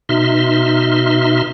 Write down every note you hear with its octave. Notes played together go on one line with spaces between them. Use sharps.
B2 D#4 E5 C6 F6